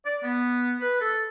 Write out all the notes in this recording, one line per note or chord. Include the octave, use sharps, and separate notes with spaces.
D5
B3
B4
A4